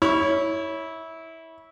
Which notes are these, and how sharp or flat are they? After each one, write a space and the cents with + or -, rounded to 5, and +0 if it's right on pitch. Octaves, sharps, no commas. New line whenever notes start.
E4 -20 C#5 +5